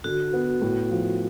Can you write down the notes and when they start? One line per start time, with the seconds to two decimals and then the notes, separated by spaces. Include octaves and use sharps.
0.04 D3 F#4
0.33 B3
0.62 A2
0.91 F3